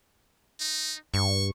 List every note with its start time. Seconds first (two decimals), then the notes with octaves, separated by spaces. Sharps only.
0.60 D#4
1.14 G2 C#6